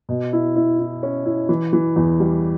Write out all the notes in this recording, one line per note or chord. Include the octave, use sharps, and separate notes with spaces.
B2
E4
E4
E4
C#4
E4
E3
E3
E2
G3